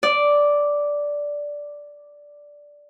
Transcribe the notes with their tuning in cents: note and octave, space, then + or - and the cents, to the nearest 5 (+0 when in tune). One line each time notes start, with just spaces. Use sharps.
D5 -5